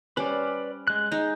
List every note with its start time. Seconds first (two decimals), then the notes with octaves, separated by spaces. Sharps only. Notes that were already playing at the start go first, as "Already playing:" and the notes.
0.17 G3 C#4 B4 C5 D5
0.88 G#3 F#6
1.11 G#3 D#4 G6